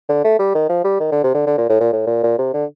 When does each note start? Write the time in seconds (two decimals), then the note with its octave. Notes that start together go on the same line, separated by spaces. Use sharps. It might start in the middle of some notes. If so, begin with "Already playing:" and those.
0.09 D3
0.24 A3
0.39 G3
0.55 D#3
0.69 F3
0.84 G3
1.00 D#3
1.12 D3
1.24 C3
1.35 D3
1.46 D3
1.58 A#2
1.69 A2
1.80 A#2
1.93 A2
2.07 A#2
2.23 A#2
2.38 C3
2.54 D3